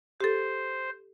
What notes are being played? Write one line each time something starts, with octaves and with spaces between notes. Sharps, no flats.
G4 A4 C5